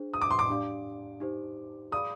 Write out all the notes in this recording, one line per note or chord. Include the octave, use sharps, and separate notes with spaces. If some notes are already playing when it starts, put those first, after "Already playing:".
Already playing: D4 G#4 C5
D#6
D6
C6
D6
D4 G4 D5 F5
D#4 G4 C5
G#4 D5 F5 B5 D6 D#6